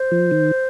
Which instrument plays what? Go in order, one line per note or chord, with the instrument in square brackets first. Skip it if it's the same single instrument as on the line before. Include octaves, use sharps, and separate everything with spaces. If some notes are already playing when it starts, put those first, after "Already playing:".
Already playing: [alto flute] C5
[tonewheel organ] F3
D#3